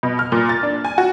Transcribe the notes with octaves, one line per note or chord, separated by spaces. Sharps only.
B2
F6
A#2
A6
D4
G#5
F#4